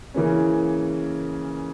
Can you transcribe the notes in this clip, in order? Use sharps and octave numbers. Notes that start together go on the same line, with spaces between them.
C#3 E3 A#3 C#4